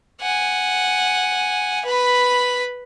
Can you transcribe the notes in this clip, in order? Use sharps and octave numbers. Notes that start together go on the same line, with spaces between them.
F#5 G#5
B4 B5